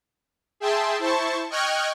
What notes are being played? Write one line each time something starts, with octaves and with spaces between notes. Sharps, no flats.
G#4 E5 G5 A5 C6
E4 C5 A5 C#6
D#5 G5 C#6 F6 F#6 G#6